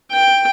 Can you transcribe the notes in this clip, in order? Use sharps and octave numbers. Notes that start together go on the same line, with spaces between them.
G5